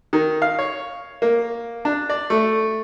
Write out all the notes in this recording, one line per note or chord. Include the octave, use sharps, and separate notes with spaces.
D#3
F5
C#5
A#3
D4
D5
A3